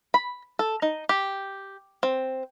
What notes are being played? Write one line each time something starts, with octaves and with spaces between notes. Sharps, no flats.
B5
A4
D#4
G4
C4